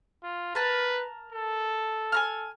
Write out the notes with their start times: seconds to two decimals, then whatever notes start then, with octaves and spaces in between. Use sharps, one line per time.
0.23 F4
0.55 A#4 B4 A5
1.32 A4
2.12 G#5 A#5 F6